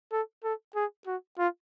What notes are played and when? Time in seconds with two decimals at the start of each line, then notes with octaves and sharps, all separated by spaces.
0.12 A4
0.44 A4
0.75 G#4
1.07 F#4
1.38 F4